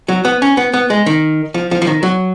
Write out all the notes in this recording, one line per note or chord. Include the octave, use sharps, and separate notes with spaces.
F#3
B3
C#4
B3
B3
G#3
D#3
F3
F3
F3
D#3
F#3